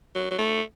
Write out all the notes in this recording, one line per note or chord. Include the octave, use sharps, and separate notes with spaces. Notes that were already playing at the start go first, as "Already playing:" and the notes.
F#3
F#3
A3